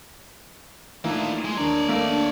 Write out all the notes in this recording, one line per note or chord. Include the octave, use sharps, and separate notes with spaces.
E3 A3 A#3 D4 D#4 F4
G#3
D#2 D4 A#4 C#5 D5 A#5
A3 A#3
D4